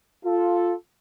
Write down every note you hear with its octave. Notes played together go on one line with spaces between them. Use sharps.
F4 A4